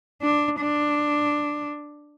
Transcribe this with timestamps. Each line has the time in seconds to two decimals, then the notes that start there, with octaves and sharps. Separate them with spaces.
0.23 D4
0.60 D4